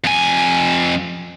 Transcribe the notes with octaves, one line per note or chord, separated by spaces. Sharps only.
F2 G#5